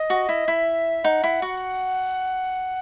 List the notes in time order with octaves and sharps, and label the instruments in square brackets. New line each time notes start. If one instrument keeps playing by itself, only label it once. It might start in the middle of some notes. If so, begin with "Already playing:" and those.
Already playing: [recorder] D#5
[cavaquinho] F#4
E4
[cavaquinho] E4 [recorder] E5
[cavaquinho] D#4 [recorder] F#5
[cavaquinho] E4
F#4